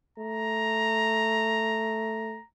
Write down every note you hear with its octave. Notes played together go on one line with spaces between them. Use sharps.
A3 A#5